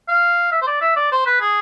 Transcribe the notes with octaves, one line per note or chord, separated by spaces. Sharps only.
F5
E5
C5
D5
E5
D5
C5
B4
G#4